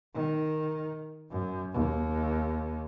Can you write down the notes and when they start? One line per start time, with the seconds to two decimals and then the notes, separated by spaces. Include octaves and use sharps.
0.14 D#3
1.31 F#2
1.73 D#2